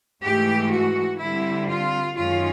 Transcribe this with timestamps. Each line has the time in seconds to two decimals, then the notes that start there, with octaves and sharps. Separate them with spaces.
0.23 G#2 E3 A3 G4
0.72 F#4
1.19 D3 G3 C4 E4
1.68 F4
2.16 F#2 D#3 G#3 C#4 F4